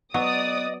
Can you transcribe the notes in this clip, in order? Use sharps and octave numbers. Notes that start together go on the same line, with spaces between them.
F#3 B3 D5 D#5 D#6